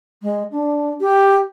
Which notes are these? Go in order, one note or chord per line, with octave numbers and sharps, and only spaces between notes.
G#3
D4
G4